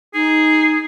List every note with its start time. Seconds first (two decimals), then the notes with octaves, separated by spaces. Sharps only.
0.14 D#4 G#4